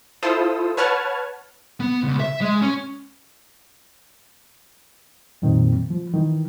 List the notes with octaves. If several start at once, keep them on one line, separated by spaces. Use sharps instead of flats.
E4 F4 A4 C5 D#6 E6
B4 C#5 F#5 A5 F6 G#6
B3
C#2
E5
G#3
C#4
F2 A#2 D#3 F#3 C4
F3
D#3 E3